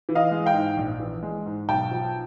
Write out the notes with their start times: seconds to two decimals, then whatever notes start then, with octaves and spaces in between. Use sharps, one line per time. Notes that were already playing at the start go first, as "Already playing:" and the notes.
0.09 E3
0.15 D#5 F5
0.31 G#3
0.46 F5 G5
0.54 G#2
0.77 A#1
1.00 E3
1.23 G#3
1.46 G#2
1.69 B1 G5 A5
1.91 F3